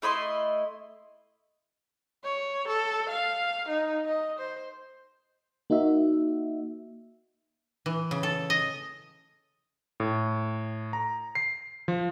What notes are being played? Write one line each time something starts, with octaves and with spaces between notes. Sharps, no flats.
A3 E4 D#5 C6
C#5
A4
F5
D#4
D#5
C5
A#3 D#4 F#4 E5
E3
C#3
A4
D#5
A2
A#5
C7
F3